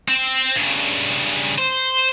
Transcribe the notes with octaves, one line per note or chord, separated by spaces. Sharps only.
C4
G2 C#3
C5